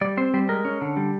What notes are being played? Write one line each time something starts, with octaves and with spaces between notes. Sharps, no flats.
G3 D5
C4 C5
G3 C5
G#3 A#4
C#4
D3
G3